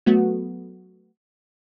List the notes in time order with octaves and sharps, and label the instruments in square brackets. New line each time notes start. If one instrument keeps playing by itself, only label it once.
[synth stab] F#3 A3 B3 F#4